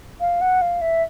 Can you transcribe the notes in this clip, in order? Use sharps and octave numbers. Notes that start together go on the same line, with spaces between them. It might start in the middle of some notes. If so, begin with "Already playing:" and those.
F5
F#5
F5
E5